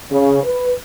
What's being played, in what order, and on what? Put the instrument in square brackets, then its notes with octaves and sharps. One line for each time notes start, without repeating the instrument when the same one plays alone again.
[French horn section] C#3
B4